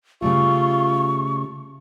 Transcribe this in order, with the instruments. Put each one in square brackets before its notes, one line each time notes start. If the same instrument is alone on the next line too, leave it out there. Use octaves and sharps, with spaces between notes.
[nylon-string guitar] C#3 G3 A3 [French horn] F4 [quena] C#6